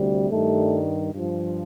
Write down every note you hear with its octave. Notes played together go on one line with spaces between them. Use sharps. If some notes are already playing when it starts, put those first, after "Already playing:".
Already playing: D2 C3 G3
G2 D#3 G3 A3
G2 F3